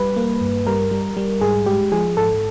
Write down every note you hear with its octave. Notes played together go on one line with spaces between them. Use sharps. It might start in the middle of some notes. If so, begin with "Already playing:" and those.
Already playing: G3 B4
A#3
G2
G3 A#4
G3
G3
G#2 G#4
G#3 G4
F3 G#4
G#2 A4